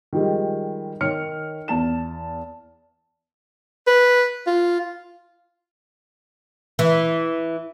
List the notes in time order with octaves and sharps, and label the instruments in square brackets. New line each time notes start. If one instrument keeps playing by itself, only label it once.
[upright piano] D#3 F3 G3 G#3
D#3 C#5 F6 C#7
E2 A5 E7
[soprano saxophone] B4
F4
[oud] E3